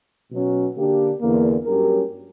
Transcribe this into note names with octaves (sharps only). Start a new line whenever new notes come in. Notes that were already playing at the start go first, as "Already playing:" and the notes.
B2 F#3 C#4
D3 A#3 D4 G4
E2 D3 A#3
G2 F#3 C#4 G4 A#4